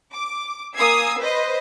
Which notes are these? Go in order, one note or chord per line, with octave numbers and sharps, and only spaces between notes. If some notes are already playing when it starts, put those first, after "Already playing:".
D6
A#3 G#5 D#6 E6 G#6 C7
B4 C5 D#5